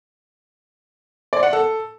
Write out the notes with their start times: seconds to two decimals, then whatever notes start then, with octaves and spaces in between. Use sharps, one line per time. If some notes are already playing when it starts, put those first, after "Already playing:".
1.33 D5
1.43 F#5
1.53 A4